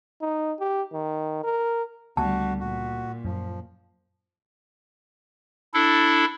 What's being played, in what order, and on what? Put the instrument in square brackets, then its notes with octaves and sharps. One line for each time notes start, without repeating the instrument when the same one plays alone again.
[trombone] D#4
G4
D#3
A#4
[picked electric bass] C#2 A3 B3 [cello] D3 G3 [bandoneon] F#4 [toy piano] A5
[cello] A#2 [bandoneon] F#4
[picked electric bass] F#2 [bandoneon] F3
[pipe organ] D4 E4 A4